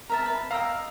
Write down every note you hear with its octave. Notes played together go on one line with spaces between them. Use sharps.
A#4 E5 A5 A#5
B4
D#5 F5 G5 A#5 E6